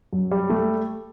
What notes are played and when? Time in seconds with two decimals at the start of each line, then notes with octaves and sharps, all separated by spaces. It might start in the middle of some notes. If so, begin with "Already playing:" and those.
0.13 F#2
0.31 G3
0.50 A3